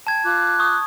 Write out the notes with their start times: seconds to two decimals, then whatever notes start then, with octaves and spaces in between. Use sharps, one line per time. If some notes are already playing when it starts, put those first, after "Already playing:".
0.07 G5 A5 G#6
0.25 F4 D6 F#6
0.59 C#6 D#6